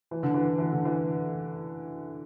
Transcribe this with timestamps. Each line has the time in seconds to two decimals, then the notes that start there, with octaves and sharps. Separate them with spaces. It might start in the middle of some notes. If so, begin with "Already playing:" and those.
0.11 E3
0.23 D3
0.34 E3
0.58 E3
0.72 D3
0.85 E3